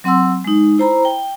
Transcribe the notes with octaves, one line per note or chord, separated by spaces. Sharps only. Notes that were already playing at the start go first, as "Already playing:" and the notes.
F#3 C4 F#5 C6 E6
G#3 D#4
E4 C5 A#5 B5
G5